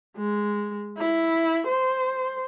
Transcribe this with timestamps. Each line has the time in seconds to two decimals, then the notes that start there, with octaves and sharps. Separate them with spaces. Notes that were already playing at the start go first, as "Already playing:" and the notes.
0.17 G#3
0.98 E4
1.68 C5